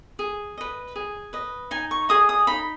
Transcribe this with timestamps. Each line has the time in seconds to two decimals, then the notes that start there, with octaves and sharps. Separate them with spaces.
0.19 G#4
0.58 B4 D#5
0.96 G#4
1.33 B4 D#5
1.71 D#4 G#5
1.91 C#6
2.09 G#4 D#5 D#6
2.29 D#6
2.47 D#4 B5